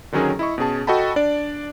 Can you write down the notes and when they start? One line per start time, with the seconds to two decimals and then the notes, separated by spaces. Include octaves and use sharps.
0.12 D3 D#3 F#3 C#4 G#4 A#4
0.39 E4 D#5 C#6
0.58 B2 C#4 G#4 A5
0.87 F#4 A4 D#5 G5 A5 B5
1.16 D4 D5